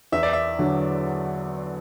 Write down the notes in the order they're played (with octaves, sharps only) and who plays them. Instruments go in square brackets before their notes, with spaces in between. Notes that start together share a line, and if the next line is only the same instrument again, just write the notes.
[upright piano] E2 [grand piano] E5
[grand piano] D5
E5
[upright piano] D3 F#3